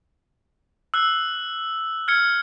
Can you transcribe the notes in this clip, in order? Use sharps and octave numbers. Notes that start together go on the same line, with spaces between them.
E6 F#6
F6 G#6 C#7